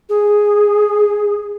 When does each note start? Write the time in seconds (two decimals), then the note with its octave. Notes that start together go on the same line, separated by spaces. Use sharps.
0.09 G#4